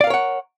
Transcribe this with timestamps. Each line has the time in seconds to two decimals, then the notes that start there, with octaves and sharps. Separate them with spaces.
0.01 D5
0.04 F5
0.07 A#4
0.10 C#5
0.14 F#5